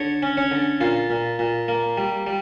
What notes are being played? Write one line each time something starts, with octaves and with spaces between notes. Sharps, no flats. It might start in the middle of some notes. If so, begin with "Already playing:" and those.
Already playing: D3 C#5
C#4
C#4 C#5
D3
A#2 F4
A#2
A#2
A#3
G3
G3